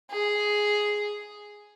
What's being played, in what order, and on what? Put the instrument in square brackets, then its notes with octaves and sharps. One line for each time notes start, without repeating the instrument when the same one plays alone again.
[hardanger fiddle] G#4